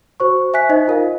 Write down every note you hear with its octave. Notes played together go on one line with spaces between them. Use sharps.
F#4 C5 C#6
E5 G#5 F#6 B6
D#4 C5 D#5
F4 A#4 F5